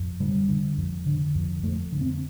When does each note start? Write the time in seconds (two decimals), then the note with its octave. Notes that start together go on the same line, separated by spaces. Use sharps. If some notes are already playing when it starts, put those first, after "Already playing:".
Already playing: F2
0.20 D3 G3
0.49 D3
0.78 F2
1.06 D3
1.35 F2
1.63 F2 A3
1.92 D3
2.01 C4